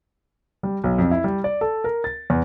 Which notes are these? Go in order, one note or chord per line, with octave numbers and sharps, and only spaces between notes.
G3
B1
F2
E4
G3
D5
A4
A#4
A6
E2